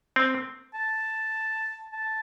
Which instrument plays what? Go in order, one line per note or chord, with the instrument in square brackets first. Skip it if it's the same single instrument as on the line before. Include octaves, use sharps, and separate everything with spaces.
[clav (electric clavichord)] C4
[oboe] A5
A5